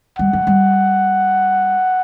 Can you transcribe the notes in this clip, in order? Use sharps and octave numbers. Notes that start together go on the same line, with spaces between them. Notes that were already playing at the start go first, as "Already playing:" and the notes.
G3 F#5
F#3
G3